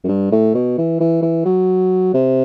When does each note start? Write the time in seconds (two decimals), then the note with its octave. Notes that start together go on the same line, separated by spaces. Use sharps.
0.04 F#2
0.08 G2
0.32 A2
0.54 B2
0.78 E3
1.00 E3
1.22 E3
1.45 F#3
2.14 C3